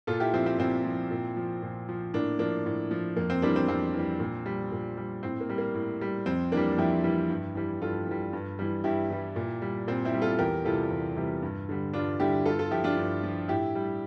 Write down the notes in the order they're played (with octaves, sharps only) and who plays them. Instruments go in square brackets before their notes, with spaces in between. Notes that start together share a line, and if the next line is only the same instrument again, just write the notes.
[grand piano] A#2 F4 A4
E4 G4
F3 C4 E4
C4
A#2 C4 E4
F3
A#2
F3
A#2
F3
A2 A#3 D4
F3 A#3 D4
A2
F3
F2 A#3
C4
E3 G3 A#3 D4
C4
F2 C4
E3 G3
A#2
G3
A#2
G3
A2 C4
A#3
G3
A#3
A2
G3
F2 C4
E3 G3 A#3 D4
F2 E4 G4
E3 G3
G2
E3 G3
G2 F4 A4
E3 G3
G2
E3 G3
G2 E4 G4
E3 G3
A#2
G3
A#2 C4
C4 E4
G3
F4 A4
E2 G4 A#4
C3 E3 G3 F4 A4
E2
C3 E3 G3
G2
D3 G3
G2 D4 F4
D3 G3 E4 G4
G2 F4 A4
F4 A4
F3 E4 G4
D4 F4
G2
F3
A2 E4 G4
G3